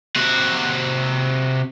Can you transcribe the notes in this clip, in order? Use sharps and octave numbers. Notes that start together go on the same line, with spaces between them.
C3 F#4